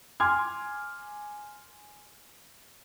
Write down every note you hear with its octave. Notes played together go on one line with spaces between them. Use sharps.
G#5 C6 D6 F6 G#6